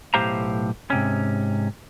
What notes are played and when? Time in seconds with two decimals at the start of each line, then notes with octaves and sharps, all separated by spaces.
0.14 B1 A2 G4 C5 F5 A#5
0.90 G#2 C3 C#4